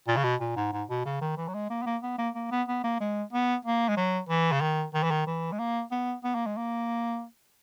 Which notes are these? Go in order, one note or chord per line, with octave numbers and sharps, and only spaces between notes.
A#2
C#3
B2
A#2
G#2
G#2
B2
C#3
D#3
E3
F#3
G#3
A#3
B3
A#3
B3
A#3
A#3
B3
B3
A#3
G#3
B3
A#3
G#3
F#3
E3
C#3
D#3
D#3
E3
D#3
E3
G#3
A#3
B3
B3
A#3
G#3
A#3